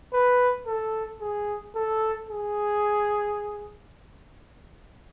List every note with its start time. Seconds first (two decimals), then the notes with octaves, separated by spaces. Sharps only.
0.13 B4
0.66 A4
1.21 G#4
1.75 A4
2.29 G#4